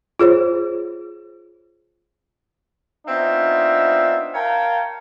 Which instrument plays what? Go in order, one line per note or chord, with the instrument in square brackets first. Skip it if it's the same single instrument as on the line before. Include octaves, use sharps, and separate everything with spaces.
[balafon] F4 G#4 C5 C#5
[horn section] B3 C4 D4 D#4 F4 E5
A#4 C#5 F5 G5 A5 A#5